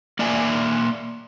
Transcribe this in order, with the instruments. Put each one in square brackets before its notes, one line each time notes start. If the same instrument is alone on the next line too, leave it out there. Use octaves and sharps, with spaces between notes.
[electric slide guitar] A#3 D5 E5 G#5